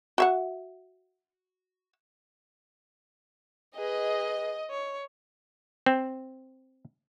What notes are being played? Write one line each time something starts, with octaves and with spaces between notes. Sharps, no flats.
F#4 E5 F#5
G#4 B4 D#5
C#5
C4